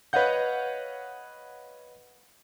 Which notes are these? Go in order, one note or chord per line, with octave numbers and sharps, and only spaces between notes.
B4 C#5 D#5 F5 F#5 G6